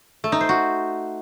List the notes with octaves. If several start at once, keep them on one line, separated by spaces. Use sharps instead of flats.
A3
D#4
C5
F#4